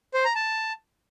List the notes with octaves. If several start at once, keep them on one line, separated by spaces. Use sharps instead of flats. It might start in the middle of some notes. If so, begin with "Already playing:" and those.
C5
A#5
A5